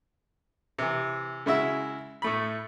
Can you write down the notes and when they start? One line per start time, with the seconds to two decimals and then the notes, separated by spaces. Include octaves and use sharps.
0.78 C3 E3
1.46 C#3 G#3 E4 F#4 E5 E6
2.22 A2 A3 B5